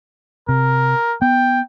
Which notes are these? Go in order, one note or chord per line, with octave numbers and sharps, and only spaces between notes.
C3 A#4
B3 G5